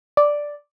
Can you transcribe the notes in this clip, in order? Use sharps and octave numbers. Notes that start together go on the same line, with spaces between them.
D5